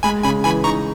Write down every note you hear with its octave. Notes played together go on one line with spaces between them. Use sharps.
G#3 G#5 B5
C#3 G#5 B5
E3 G#5 B5
D#4 A#5 C#6